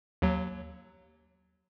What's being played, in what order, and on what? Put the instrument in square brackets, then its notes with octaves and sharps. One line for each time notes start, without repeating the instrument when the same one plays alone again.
[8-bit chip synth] D#2 F#3